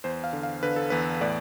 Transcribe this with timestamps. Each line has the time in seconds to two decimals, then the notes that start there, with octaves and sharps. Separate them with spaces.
0.04 E2 C5
0.24 F5
0.33 D3
0.43 F5
0.63 D3 B4
0.76 A4
0.90 E2 B4
1.21 A2 D5